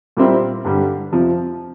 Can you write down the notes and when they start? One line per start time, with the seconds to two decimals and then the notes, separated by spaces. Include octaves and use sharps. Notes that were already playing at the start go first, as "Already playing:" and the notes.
0.17 A#2 G3 C4 E4 A#4
0.65 G2 D3 G3
1.12 F2 C3 F3